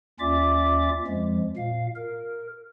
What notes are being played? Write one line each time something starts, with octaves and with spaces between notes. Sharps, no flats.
D#2 C#4 F4 D5 E5 D6
F2 F3 G#3
A#2 F5
A#4